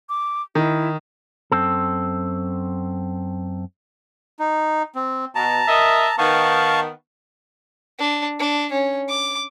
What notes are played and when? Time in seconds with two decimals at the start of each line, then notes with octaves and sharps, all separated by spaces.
0.09 D6
0.55 D#3 E4
1.52 F#2 C4 A4
4.39 D#4
4.95 C4
5.35 B2 A5 A#5
5.68 A#4 D#5 E5
6.18 D#3 B3 F5 A5 C#6
7.99 D4
8.39 D4
8.72 C#4
9.09 D6